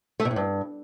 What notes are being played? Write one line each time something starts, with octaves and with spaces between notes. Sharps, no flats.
A3
B2
A2
G2